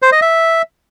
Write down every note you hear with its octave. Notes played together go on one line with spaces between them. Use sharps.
C5
D#5
E5